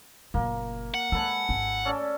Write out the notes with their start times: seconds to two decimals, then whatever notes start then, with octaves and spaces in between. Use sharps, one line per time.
0.34 F#1 A#2 A#3
0.94 F#5
1.12 G#3 A4 B4 G#5
1.49 G#1 E4
1.85 C#4 A4 D5